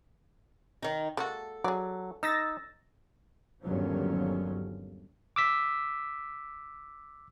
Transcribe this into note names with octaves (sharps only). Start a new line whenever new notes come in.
D#3 D#4
G#3 A#3 F#4 A4
F#3 G#4 D5
D#4 E6 A6 A#6
G1 D#2 A#2 F3 F#3 C#4
D6 E6 B6